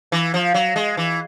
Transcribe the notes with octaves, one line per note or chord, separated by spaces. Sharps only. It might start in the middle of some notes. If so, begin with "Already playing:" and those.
E3
F3
F#3
G#3
E3